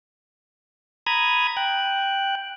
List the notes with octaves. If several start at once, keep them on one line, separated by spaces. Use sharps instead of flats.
A#5 B5 D#6 G#6
G5 F#6